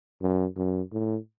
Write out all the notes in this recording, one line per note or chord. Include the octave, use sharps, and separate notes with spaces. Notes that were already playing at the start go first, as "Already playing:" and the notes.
F#2
F#2
A2